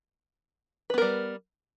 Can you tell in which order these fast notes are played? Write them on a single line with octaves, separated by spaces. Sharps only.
B4 B3 A#4 G3